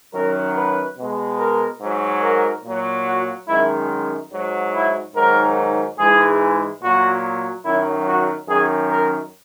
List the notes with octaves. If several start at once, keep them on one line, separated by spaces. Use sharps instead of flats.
F#2 D#3 F#3 A#4
B4
B2 G#3
A#4
G#2 F#3
A#4
A#2 F#3
F#4
F#2 D#3 G#3 E4
G#2 F#3
E4
G#2 D#3 F#3 A#4
G#2 E3 G#3 G#4
A#2 F#3 F#4
F#2 D#3 F#3 E4
F#4
F#2 D#3 F#3 G#4
A#4